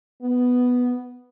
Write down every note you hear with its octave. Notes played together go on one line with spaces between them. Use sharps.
B3